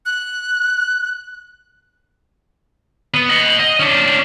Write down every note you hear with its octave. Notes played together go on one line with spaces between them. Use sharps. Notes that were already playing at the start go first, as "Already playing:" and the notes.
F#6
B3
D#5 F#5
D#5
C#4 D4